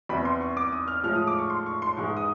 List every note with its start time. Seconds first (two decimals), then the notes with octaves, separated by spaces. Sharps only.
0.09 E2 C3 E3 G3 B5
0.25 C6
0.41 C#6
0.57 D6
0.72 D#6
0.88 F6
1.04 A2 F3 G#3 F6
1.15 D#6
1.27 D6
1.38 C#6
1.50 C6
1.66 C#6
1.82 C6
1.97 G#2 E3 G#3 C#6
2.17 D#6